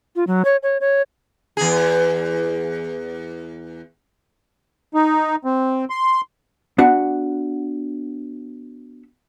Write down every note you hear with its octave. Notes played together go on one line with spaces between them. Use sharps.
F4
F#3
C#5
C#5
C#5
E2 G#4
D#4
C4
C6
B3 D4 F#4 E5 F#5